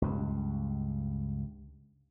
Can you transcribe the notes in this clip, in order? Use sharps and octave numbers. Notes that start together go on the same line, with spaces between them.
C#2 G2